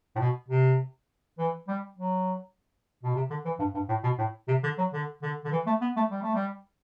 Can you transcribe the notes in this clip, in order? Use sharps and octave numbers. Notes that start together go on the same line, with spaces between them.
A2
B2
C3
E3
G3
F#3
B2
C3
D3
E3
G2
G2
A2
B2
A2
C3
D3
F#3
D3
D3
D3
E3
A3
B3
A3
G3
A3
G3